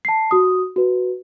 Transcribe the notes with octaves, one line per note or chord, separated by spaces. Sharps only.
A5 C7
F#4 D#6
F#4 B4